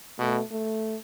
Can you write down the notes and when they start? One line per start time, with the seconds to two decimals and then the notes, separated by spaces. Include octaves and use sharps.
0.19 B2 A3
0.51 A3